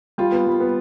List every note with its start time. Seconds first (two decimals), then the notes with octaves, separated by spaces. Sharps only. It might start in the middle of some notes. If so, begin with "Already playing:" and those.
0.18 G3 F4
0.32 B3
0.47 G3
0.60 B3